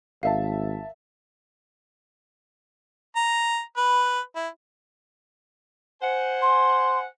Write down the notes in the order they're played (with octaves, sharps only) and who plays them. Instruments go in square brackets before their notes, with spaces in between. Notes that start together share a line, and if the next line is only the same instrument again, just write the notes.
[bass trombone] G#1 [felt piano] A#4 E5 A5 [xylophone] F5
[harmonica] A#5
B4
E4
[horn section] C5 F#5 G#5
[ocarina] C6